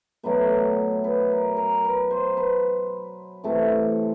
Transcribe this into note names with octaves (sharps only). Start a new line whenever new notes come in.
B2 F#3 A3 B4
B4
A#4
A#4
B4
C5
B4
C3 E3 A3